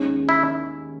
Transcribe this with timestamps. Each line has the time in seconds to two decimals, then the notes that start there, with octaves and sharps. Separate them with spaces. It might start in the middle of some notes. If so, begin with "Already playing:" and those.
Already playing: D#2 D#3 G#3 C#4
0.29 E4